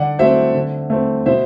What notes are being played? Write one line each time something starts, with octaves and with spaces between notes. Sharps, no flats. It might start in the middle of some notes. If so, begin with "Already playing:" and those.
Already playing: D3 D5 F#5
F#3 A3 C4 C5 E5
D3
A3 C4
B2 C5 E5